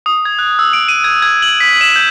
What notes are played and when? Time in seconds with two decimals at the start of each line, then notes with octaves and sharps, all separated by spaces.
0.06 D#6
0.25 G#6
0.39 F#6
0.59 E6
0.73 D7
0.89 D#7
1.04 G#6
1.22 G#6
1.42 F#7
1.60 B6
1.81 E7
1.96 G6